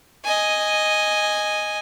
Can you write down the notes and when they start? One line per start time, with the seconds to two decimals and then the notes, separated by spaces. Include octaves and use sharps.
0.24 D#5 G#5